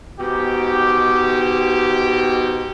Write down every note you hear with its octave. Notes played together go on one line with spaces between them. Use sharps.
G#2 B2 G4